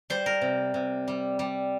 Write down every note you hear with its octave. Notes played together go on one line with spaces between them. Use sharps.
G3 C5
A#4
C3
C3
G3
G3